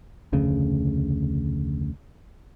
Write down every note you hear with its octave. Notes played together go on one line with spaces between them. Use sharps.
F1 D2 C#3